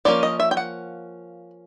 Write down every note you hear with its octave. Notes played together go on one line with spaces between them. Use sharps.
F3 A#3 C#4 D5
D#5
E5
G5
F#5